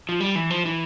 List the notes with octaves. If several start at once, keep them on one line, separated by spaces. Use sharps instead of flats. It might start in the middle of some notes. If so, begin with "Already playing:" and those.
F3
G3
E3
F3
E3